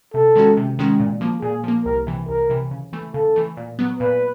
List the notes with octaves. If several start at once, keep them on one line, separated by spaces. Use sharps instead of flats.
C3 A4
D#3 G#3 C#4 F#4
C3
D#3 G#3 C#4 F#4
A#2
F3 A#3
A#2 G#4
F3 A#3
C2 A#4
C3 E3
C2 A#4
C3 E3
C#3
E3 A3
C#3 A4
E3 A3
A#2
F#3 B3
A#2 B4